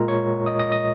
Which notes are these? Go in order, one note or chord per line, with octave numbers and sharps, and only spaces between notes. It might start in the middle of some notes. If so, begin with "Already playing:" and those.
Already playing: A#2 G#3 F4 A#4 A#5
C#5 C#6
D#5 D#6
D#5 D#6
D#5 D#6